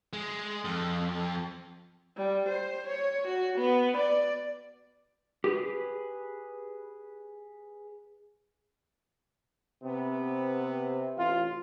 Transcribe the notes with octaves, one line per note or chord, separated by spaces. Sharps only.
G#3
F2
G3
C5
C#5
F#4
B3
D5
G4 G#4 B4
C3 B3 C4
A1 F4